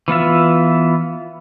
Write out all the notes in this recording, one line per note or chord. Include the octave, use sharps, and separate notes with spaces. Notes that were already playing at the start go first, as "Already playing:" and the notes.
E3 B3 F4 E5